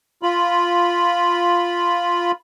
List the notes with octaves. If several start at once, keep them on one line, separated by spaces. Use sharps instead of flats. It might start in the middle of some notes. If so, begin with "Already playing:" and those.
F4 B5